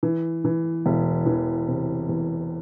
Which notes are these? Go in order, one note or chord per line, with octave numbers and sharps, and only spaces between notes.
E3
E3
E1
E3
C3
E2